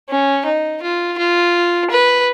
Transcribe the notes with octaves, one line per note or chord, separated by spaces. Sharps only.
C#4
D#4
F4
F4
B4